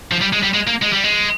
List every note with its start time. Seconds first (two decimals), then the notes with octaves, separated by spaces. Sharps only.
0.12 F3
0.21 G3
0.33 G#3
0.43 G3
0.54 G#3
0.67 A#3
0.82 G#3
0.93 G3
1.04 G#3